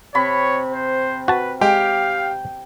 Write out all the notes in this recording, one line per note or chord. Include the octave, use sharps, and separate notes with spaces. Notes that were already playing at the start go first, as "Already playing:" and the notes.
C3 C#5 B5 C#6
C5
F#4 B4 A5
G#3 G4 F5 G5